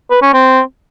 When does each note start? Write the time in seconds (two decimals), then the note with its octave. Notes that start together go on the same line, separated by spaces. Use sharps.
0.11 B4
0.22 C#4
0.33 C4